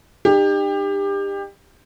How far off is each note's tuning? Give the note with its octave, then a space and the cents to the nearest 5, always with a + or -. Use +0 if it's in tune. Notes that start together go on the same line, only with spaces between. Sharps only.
D#4 -40 G4 +25